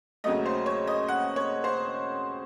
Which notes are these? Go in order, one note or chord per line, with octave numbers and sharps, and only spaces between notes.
D#2 C#3 F#3 A3 D#5
C5
C#5
D#5
F#5
C#5
C5